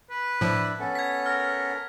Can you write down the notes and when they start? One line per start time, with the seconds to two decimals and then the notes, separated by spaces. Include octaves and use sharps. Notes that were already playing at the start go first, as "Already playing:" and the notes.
0.10 B4
0.41 A2 F3 D4 E4
0.80 B3 C#4 A4
0.95 G#6 B6
1.26 A#4 F6